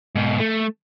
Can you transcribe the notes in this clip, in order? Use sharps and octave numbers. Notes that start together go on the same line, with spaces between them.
G#2 B2
A3